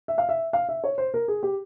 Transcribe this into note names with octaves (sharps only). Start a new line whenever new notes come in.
E5
F5
E5
F5
E5
C#5
C5
A#4
G#4
G4